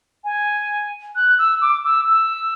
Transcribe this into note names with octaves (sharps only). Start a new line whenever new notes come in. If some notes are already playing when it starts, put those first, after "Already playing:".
G#5
F#6
E6
D6
E6
E6